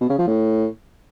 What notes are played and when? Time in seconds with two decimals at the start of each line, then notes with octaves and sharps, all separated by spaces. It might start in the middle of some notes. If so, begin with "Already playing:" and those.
0.01 B2
0.09 C#3
0.18 F3
0.27 A2